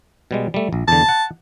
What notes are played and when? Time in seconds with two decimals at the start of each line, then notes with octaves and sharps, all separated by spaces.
0.31 B2 G3 G#3
0.54 G3 A3
0.73 A#1
0.88 E2 D3 A5
1.09 F#5